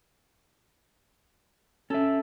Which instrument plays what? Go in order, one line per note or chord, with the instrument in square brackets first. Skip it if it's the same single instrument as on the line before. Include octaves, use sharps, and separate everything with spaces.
[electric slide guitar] C#4 E5 [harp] A4